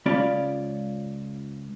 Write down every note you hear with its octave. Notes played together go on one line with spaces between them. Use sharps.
C#2 G#3 C#4 F4 D5 B5